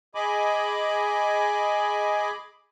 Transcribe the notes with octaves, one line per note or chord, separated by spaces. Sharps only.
G#4 D#5 G#5 B5 D6